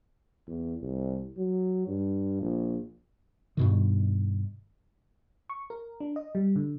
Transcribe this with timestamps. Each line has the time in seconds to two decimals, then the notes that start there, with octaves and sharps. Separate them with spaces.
0.47 E2
0.81 C2
1.38 F#3
1.87 G2
2.41 A#1
3.57 G2 B2 D#3
5.50 C#6
5.70 A#4
6.00 D4
6.16 D#5
6.35 G3
6.56 D3